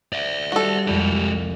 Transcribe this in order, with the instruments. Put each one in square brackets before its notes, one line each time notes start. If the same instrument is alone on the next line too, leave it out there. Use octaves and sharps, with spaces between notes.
[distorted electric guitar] D5 E5
[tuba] G3 [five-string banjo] F#4 A4 [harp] C6
[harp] C2 F2 [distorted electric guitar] G#3 G4